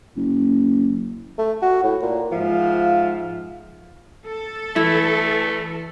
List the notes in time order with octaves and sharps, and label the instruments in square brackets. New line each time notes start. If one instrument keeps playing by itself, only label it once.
[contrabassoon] F#1
[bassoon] A3
F#4
A2
A#2
[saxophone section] G#2 F3 E5 F5
[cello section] A4
[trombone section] E3 [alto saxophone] A3 [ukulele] E4